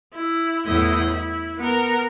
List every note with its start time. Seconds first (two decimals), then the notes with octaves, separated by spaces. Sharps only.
0.13 E4
0.66 E2 A2 E4 D#6 G6
1.10 E4
1.59 B3 A#4